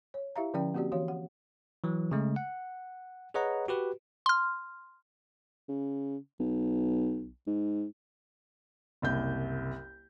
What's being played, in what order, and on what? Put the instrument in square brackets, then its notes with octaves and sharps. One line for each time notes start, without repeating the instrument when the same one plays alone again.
[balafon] C#5
E4 G4 E5 F5 A#5
D3 F3 C#4 D5 G5
A#3 C4 F#4 G4 D5
E3 F#4 C#5 F5
F#5
[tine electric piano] E3 F#3
C#3 G#3 A3
F#5
G#4 B4 C#5 D#5 F#5 A#5
F#4 G4 B4
[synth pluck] C6 F6
[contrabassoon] C#3
B1
G#2
[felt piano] F#1 C2 G6